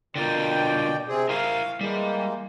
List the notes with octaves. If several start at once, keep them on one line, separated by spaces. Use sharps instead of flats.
B2 D3 F4 A#4 D5 G5
C3 C4 G#4
E4 A#4 F5
E3 G3 G#3 A#3